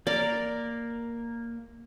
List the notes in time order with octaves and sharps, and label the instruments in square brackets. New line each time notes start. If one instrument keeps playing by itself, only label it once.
[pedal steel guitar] A#3 A#4 [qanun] D5